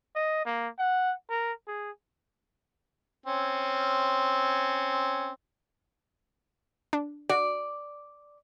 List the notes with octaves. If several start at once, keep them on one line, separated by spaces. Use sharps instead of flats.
D#5
A#3
F#5
A#4
G#4
C4 C#4
D4
F#4 D5